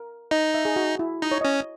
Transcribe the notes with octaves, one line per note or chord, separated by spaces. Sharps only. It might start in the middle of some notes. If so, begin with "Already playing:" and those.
Already playing: A#4
D#4 D#5
E5
G#4
F#4
E4
D#4 D#5
C#5
C#4 D#5